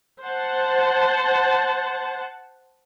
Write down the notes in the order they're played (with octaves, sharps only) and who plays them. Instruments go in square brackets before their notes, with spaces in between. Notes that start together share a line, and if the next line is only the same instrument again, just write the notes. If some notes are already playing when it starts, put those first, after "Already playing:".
[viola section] C5 F#5 A5